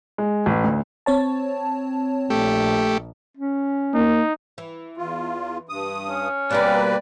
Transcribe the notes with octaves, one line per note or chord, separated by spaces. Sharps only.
G#3
A1
D2
C4 C#5 A5
A#1 A3 G4
C#4
A#3 D#4
E3
E2 F4
G2 D#6
C#4
B2 G3 A#3 C4 B4 D5